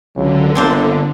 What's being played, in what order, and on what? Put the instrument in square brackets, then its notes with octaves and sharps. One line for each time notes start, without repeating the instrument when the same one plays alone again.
[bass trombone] C#2 [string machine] D3 [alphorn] F#3
[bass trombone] G1 [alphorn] A#3 [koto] C4 D4 C5